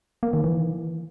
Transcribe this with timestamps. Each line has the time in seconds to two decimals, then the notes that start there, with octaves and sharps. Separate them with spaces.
0.23 A#3
0.33 D#3
0.44 E3